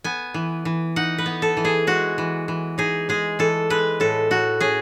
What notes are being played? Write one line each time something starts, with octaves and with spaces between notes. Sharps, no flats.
B3 G#5
E3
E3
D#4 F#5
B4
B3
A4
E3
G#4
G#3 F#4
E3
E3
D#4 G#4
G#3 G#4
E3 A4
G#3 B4
A2 A4
A2 F#4
C#4 G#4